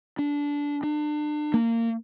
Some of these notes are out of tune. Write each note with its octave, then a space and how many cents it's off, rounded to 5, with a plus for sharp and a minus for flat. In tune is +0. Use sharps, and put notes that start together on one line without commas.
D4 -20
D4 +35
A#3 -25